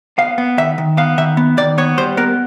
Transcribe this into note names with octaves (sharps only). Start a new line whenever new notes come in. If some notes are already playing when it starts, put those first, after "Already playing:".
B3 F5
B3
D#3 E5
D#3
B3 F5
D#3 E5
B3
D#3 D5
B3 C#5
G3 C5
B3 A#4